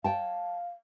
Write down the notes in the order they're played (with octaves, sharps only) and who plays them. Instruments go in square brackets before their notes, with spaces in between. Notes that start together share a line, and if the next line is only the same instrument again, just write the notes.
[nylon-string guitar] C#5 G5 A5 [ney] F5